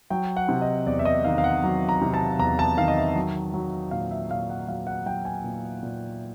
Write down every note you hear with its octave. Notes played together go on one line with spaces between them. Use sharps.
F#3 G5
F#5
C3
D#5
E2 D5
E5
D#5
D#3 F5
F5
F#5
F#3
A#5
C3
A5
E2 A#5
A5
D#3 F5
D#5
E5
F#3
F#3
A#2 F5
E5
A#2 F5
F#5
F#3 F5
F#5
F#3 G5
G#5
A#2
A#2